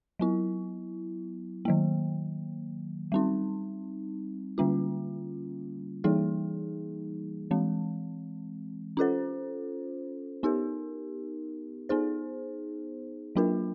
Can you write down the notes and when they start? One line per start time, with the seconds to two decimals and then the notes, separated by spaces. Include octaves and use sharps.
0.19 F#3 B3 E4
1.65 D#3 F#3 A#3
3.12 G3 C4 D#4
4.58 D3 G3 A#3 C#4 F4
6.04 E3 G3 A#3 D#4 G#4
7.51 E3 G#3 C4
8.97 C#4 F4 A4 C5
10.43 B3 D#4 G4 A#4
11.89 B3 D#4 G#4 C5
13.36 F#3 A#3 D4 F4 A#4